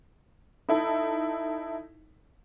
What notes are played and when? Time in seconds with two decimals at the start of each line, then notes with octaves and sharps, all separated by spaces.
0.69 D#4 E4 A4